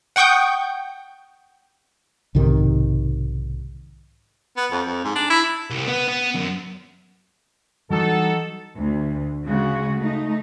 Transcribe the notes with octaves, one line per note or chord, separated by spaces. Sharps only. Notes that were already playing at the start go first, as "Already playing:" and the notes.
F#5 G5 C#6 D#6 G6
B1 G#2 C3 D#3
B3
F2
F2
G#2
D4
E4
C2
B3
B3
F#2
E3 F#3 G3 D#4 F#4 A4
D2
C#3 G#3 F#4
A3 D#4